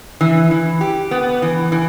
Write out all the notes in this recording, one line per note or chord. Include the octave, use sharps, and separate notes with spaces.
E3
E3
G4
B3
E3
E3